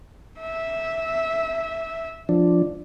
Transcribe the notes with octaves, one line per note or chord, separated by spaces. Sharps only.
E5
F3 D4